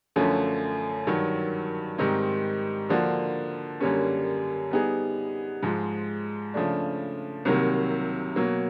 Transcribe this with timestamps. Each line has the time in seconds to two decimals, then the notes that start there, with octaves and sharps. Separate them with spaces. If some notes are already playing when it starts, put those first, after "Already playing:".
0.16 F#2 D3 F3 A3 C#4
1.07 G2 D#3 F#3
1.98 G#2 D#3 G3 C4 D#4
2.89 D3 F3 A#3 D4 F#4
3.80 F#2 D3 G3 A#3 C#4
4.71 G3 B3 D#4 G#4
5.63 G#2 F3 G#3
6.54 C#3 F3 A3 D4
7.45 C2 C3 D#3 F#3 A#3
8.36 B2 F#3 A#3